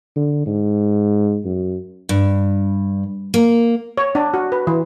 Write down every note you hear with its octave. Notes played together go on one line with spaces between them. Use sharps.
D3
G#2
F#2
G2
A#3
C#5
D4
F#4
B4
E3